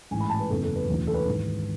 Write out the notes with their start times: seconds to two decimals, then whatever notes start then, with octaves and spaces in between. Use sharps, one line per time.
0.11 A1 G#2 E3 G#5
0.20 B5
0.30 A5
0.40 B4
0.49 F#1 E2 C#3 E3 A4
0.62 A4
0.76 B4
0.87 E1 D2 C#3 E3
1.07 A4
1.14 B4
1.26 G#1 G#2 E3